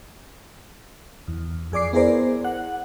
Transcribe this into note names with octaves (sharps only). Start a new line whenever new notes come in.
E2
F2 G#4 D5 D6 C7
B3 E4 G#4 A#4 C5 D5
F#5